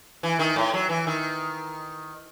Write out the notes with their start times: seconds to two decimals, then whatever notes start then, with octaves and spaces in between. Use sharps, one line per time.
0.23 E3
0.39 D#3
0.56 A2
0.74 F#3
0.89 E3
1.07 D#3